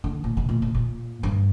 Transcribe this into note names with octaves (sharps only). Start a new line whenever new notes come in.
D3
A#2
C3
A#2
C3
A#2
G2